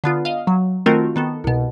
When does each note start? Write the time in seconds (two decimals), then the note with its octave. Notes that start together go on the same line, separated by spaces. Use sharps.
0.04 D3 B3 F4
0.25 D#5 F5
0.47 F#3
0.86 D#3 A3 C4 F4 F#4 A#4
1.16 D#3 B3 A4
1.44 C2 B2